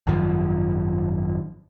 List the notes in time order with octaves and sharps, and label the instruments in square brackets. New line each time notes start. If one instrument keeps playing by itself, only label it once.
[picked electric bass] G#1 F#2 D#3 F3